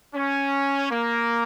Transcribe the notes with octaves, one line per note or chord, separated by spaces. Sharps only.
C#4
A#3